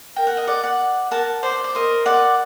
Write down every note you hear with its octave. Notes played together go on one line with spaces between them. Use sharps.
A#4 G5
F#5
D#5
D5 F#5
D5 F#5
A#4 F#5 A5
C5 D5
D5
A#4 C5 D#5
D5 F#5